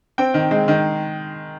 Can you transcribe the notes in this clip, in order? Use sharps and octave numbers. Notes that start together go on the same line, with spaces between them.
C4 G5
D#3
G#3
D#3